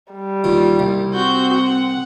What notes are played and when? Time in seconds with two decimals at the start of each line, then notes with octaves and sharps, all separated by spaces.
0.12 G3
0.44 D#2 A#2
0.79 C2
1.13 C4 F#4 G6
1.54 F#5